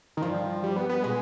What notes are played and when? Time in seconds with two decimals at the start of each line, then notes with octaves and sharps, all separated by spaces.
0.17 D#3
0.22 G2 F3
0.63 G3
0.76 B3
0.89 B3
1.03 B2 G#3